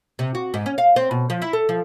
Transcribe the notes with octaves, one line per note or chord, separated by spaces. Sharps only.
C3
F#4
G#2
C#4
F5
C4
B2
F3
E4
A4
F3